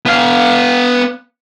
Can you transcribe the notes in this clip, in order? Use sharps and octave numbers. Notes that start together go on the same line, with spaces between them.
B3 F5